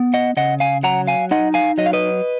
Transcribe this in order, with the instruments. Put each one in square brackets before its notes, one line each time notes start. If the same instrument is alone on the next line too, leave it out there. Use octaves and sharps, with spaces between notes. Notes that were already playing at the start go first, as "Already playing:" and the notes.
Already playing: [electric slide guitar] B3
D#5 F#5
C#3 D#5 F#5
F5 G#5
F#3 F#5 A#5
F5 G#5
D#4 D#5 F#5
F5 G#5
F#3 D#5
F5
B4 D#5